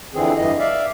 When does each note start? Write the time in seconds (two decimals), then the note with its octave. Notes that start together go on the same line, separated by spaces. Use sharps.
0.14 F2 D3 E3 C4 G#4
0.37 G2 E3 D#5
0.59 D5 E5 F5